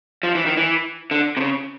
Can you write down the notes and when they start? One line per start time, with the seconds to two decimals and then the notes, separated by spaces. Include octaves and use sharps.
0.23 F3
0.35 E3
0.46 D#3
0.57 E3
1.11 D3
1.37 C3
1.41 C#3